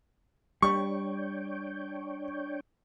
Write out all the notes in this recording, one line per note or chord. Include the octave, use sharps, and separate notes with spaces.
G3 D4 C#5 G5 C#6